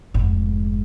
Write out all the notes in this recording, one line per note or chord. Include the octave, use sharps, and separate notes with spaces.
F1 G#2